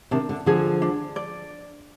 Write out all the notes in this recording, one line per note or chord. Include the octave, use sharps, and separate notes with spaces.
C3 D#3 D4
D3
D3 F3 G#4
D4
D5